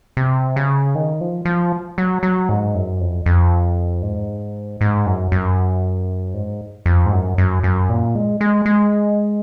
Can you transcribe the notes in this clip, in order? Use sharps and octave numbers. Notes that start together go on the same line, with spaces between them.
C3
C#3
D#3
F3
F3
F#3
F#3
G#2
F#2
F2
F2
G#2
G#2
F#2
F#2
G#2
F2
G#2
F#2
F#2
F#2
A#2
G#3
G#3
G#3